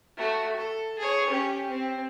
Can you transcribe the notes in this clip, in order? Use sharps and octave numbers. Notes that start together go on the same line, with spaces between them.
A3 F#4
A4
G#4 C#5
C#4 G4
C4